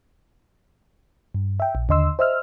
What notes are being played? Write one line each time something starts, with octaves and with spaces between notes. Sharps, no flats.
G2
E5 G5
A#1
D#2 D3 D#5 C6 E6
C5 D#5 E5 E6 F6